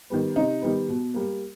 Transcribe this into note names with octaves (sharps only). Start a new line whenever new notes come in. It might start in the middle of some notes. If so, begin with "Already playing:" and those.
D#3 G3 B3
C3 D#4
D#3 G3 B3
B2
G3 A#3